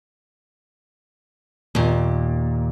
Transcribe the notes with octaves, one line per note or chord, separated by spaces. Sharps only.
D#2 A#2